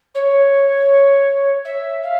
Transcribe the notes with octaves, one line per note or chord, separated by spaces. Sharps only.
C#5
E5
F5